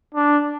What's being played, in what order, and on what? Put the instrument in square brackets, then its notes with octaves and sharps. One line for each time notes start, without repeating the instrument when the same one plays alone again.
[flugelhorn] D4